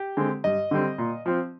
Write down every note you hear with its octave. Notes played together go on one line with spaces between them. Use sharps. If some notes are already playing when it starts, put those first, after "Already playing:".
Already playing: G4
D3 G#3 C4
G2 D#5
D3 G3 C4
A#2
F3 C4